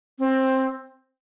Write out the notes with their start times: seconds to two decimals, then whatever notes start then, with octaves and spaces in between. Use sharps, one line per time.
0.19 C4